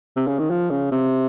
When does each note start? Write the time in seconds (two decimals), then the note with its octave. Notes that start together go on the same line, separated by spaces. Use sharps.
0.16 C3
0.27 C#3
0.39 D#3
0.50 F3
0.70 C#3
0.92 C3